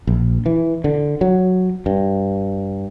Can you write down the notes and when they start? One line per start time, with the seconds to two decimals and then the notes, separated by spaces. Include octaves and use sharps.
0.07 A#1
0.46 E3
0.84 D3
1.21 F#3
1.86 G2